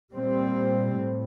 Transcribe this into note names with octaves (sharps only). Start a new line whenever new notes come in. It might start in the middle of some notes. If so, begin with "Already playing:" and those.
A#2 G3 C4
A2